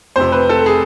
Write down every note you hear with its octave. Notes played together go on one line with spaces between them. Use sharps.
F1 F2 C3 C5
B4
A4
G#4